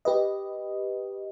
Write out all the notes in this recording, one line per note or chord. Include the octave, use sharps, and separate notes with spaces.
G4 B4 D#5